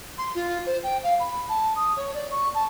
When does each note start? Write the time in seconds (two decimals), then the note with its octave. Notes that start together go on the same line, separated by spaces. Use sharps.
0.18 C6
0.35 F4
0.66 C5
0.83 G5
1.04 F5
1.20 B5
1.49 A5
1.76 D#6
1.97 C#5
2.14 D5
2.31 C#6
2.54 A5